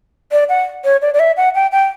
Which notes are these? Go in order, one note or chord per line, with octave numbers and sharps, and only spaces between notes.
D5
F#5
C#5
D5
D5
E5
F#5
G5
G5